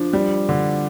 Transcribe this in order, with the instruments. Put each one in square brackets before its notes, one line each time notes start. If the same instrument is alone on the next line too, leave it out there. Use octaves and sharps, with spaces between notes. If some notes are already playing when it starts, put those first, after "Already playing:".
Already playing: [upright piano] F3 [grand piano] D4
[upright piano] G3
D3